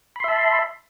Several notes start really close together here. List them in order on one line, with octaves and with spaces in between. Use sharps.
B5 C6 E5 A5